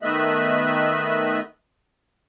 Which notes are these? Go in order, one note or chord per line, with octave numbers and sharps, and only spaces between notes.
D#3 A3 B3 D#5 E5 F#6